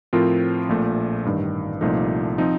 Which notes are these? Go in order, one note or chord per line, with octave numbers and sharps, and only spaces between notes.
A2 F3 C4 F4 A#4
A#1 A#2 A3
A1 G2 D#3
C2 A#2 F3 A3 D#4
F3 C4 D#4